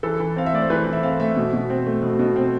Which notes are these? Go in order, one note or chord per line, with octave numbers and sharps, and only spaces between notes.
E3 A4
E3
C4 F5
E5
A3 D5
C5
E3 B4
E3
E5
C4 F5
A3 E5
B2
B2
C4
A3
B2
B2
C4